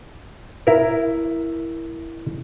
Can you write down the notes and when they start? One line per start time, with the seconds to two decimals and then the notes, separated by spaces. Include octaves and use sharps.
0.67 E4 A#4